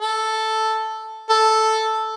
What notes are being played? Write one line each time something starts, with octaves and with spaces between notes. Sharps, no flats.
A4
A4